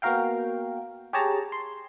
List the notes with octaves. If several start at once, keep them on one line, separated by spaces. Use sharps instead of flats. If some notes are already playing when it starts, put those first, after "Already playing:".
A#3 B3 F#4 A#4 F5 G5
G4 G#4 C#5 A5 A#5
C6